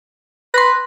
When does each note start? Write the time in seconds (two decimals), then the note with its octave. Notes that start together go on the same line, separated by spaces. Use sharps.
0.54 B4 C6 A#6